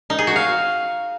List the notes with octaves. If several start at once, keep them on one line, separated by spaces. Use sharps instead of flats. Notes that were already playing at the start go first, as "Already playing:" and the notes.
D#4
G#4
F#4
F5